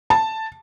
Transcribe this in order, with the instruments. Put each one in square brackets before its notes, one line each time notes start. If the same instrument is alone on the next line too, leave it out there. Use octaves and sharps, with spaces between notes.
[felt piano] A5